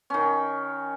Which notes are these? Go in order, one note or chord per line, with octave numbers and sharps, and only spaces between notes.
D#3 C#4